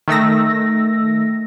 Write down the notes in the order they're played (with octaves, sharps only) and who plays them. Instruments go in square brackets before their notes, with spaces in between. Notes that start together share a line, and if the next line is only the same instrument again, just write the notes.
[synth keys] D#3 A3 E6 A#6